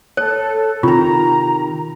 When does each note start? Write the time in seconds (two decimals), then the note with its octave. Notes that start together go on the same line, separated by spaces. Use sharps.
0.17 A4 C#5
0.83 C3 D#3 F4 A#5